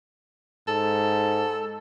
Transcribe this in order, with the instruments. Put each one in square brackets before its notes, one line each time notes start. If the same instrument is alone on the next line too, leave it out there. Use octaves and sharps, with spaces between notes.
[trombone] G#2 [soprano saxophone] A4